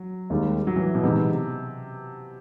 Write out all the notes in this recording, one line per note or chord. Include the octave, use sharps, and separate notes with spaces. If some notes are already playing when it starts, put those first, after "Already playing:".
Already playing: F#3
D#2 D#3 G3 G#3
F#3
E3
B2
C3 E3 G#3 B3 D#4